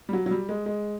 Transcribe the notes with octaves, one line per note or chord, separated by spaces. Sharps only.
G3
F#3
F#3
G3
G#3
G#3